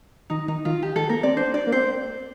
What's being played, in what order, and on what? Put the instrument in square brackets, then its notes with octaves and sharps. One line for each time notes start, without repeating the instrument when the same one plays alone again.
[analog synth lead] D#3 [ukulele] D#4
[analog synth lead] D#3 [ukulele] D#4
[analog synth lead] D#3 [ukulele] F4
[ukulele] G4
[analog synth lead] D#3 [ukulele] A4
[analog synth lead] A#3 [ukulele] A#4
[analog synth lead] C4 [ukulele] D5
[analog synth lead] D4 [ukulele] C5
[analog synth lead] D4 [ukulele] D5
[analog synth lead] A#3
[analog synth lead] C4 [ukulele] C5